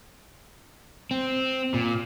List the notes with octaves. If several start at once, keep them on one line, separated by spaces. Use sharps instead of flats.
C4
A#2